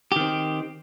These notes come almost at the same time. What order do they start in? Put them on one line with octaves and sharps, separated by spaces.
G4 D#3 C4